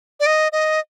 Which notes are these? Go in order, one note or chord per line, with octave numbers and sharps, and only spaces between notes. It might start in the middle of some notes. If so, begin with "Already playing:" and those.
D5
D#5
D#5